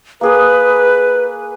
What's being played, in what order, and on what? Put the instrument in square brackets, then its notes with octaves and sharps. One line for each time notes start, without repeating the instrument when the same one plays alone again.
[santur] A#3 G#4 D#6 [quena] B4